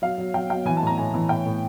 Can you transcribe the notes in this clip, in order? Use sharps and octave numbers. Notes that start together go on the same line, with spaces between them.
F#3 F5
F#3
F#3 G5
F#3 G5
E3 G#5
A5
A2 A#5
A2 G#5
E3
A2 G5
A2